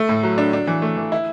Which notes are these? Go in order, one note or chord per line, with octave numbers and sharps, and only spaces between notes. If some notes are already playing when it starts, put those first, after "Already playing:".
Already playing: A3
A2
F#3
D4
D4
E3
A3
E3
E4